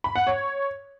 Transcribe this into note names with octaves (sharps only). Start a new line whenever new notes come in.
B5
F#5
C#5